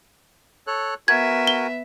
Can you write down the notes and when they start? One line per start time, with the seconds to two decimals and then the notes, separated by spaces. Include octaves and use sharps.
0.67 A4 C#5 F#6
1.08 B3 F#4 A#4 E5 G#5 G#6
1.47 G7